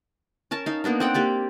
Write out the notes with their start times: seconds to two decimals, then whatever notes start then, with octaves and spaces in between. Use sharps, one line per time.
0.51 C#4 A#4 A5
0.66 D#4 F5
0.84 A#3 B3 D4 D#4
1.00 C4 F#5 G5
1.14 A#3 G4 D5